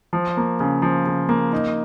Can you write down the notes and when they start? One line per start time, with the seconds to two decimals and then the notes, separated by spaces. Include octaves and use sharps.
0.13 F3
0.37 A#3
0.60 C#3
0.82 F3
1.07 C#3
1.29 A#3
1.53 D#4